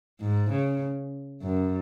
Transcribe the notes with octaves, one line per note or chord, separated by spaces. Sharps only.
G#2
C#3
F#2